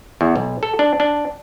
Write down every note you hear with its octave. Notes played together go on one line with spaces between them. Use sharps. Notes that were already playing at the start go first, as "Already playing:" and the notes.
E2
B1
A4
D4
D4